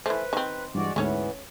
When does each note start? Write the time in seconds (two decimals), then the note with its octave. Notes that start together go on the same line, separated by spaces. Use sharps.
0.06 E3 A3 B4 C5
0.33 D#3 C4
0.75 G2 E3 G#3 F#4 D5
0.96 D2 G#2 E3 A3 B3 C#4 C#5